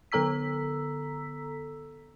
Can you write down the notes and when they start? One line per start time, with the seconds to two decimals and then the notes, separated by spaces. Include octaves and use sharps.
0.12 D3 B3 A4 A#5 E6 B6